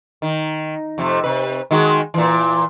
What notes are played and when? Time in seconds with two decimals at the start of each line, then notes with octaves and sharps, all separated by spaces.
0.22 D#3
0.98 F2 C3 A3
1.24 C3 B4
1.71 D#3 G#3 F#4
2.14 A#2 E3